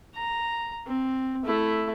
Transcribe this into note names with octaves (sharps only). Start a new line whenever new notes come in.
A#5
C4
A3 E4